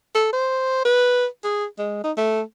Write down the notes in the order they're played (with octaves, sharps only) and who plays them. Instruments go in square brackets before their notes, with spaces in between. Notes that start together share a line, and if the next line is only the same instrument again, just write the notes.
[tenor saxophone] A4
C5
B4
G#4
G#3
D#4
A3